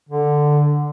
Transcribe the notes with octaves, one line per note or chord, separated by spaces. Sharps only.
D3